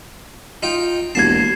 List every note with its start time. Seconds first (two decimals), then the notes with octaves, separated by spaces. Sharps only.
0.63 D#4 F4 G5
1.15 E1 D#2 A#3 A5 G#6 C7